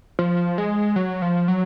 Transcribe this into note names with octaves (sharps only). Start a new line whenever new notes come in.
F3
G#3
F#3
F3
F#3